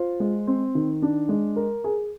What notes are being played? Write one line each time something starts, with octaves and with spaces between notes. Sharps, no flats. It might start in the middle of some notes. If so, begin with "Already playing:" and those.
Already playing: F4 C5
G#3
C4
D#3
D4
G#3
A#4
G#4